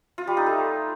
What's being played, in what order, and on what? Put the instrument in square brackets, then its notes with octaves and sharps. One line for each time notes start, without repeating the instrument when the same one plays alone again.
[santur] F4
G3
D#4
A3